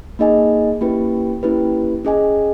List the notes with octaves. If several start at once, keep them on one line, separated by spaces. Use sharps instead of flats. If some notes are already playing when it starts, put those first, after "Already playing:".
A#3 D#4 G#4 D#5 G#5
A#3 C#4 E4 G4 B4
A#3 C#4 E4 G4 B4
C#4 G#4 D#5 G#5